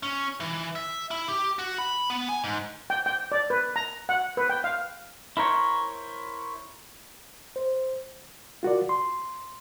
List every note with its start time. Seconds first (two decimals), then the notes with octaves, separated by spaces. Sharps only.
0.03 C#4
0.40 E3
0.75 E5
1.11 E4
1.28 G4
1.59 F#4
1.78 B5
2.10 B3
2.29 G#5
2.44 G#2
2.90 G5
3.06 G5
3.32 D5
3.50 B4
3.76 A#5
4.09 F#5
4.37 B4
4.50 G5
4.64 F5
5.37 E4 A#4 C5 C#5
7.56 C5
8.63 F4 F#4 A#4 D5
8.89 C6